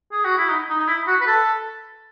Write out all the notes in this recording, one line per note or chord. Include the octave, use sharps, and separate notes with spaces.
G#4
F#4
E4
D#4
D#4
D#4
E4
F#4
B4
A4